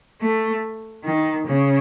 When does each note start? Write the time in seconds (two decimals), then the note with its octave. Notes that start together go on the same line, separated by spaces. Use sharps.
0.21 A3
1.04 D#3
1.46 C#3